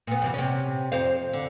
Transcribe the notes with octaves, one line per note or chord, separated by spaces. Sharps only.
A#2 B3
F#2 C3 E3
C3 C#4
F2 C5 F5
D3